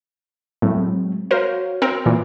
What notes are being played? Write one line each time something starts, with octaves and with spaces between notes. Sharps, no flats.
A2 F#3 G#3 C4
F#4 A#4 C5 C#5 F5
C4 A#4
A#2 E3